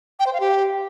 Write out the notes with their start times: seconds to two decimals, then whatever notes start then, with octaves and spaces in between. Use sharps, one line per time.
0.19 G5
0.26 C5
0.33 F5
0.40 G4